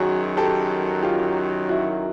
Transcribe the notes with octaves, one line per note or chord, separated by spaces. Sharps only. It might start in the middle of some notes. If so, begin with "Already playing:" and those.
Already playing: F#2 D#3 F#3 F#4 G#4
G4 A4
F4 G4
E4 F#4